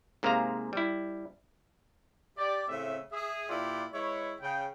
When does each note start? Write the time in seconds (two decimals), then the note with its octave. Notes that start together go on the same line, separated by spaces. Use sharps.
0.23 G#2 C3 A#3 G#4 F5 A#5
0.73 G3 E4
2.37 G4 D5
2.68 A2 C#3 C4 E5
3.12 G#4 E5
3.49 A#2 E4 F4 G4 B4 D5
3.93 G#3 E4 B4 C#5
4.41 C#3 G5